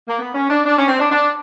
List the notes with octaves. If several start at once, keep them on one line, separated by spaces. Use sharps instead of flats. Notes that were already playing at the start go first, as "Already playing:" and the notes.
A#3
B3
C#4
D4
D4
C#4
C4
D4
D4